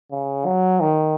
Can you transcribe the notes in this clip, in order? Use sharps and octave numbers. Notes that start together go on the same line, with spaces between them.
C#3
F#3
D#3